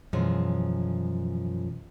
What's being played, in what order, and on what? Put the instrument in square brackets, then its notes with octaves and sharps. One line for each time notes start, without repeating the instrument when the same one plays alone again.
[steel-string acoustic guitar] F#2 F3 G#3 [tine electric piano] B2 E3